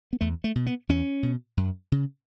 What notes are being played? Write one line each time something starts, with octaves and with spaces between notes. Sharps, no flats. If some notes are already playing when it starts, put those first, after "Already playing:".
B3
E2 A3
A3
B2
B3
E2 C#4
B2
F#2
C#3